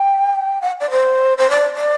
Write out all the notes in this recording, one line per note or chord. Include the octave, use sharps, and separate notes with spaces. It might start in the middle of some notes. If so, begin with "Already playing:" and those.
Already playing: G5
F#5
D5
C5
C5
D5
D5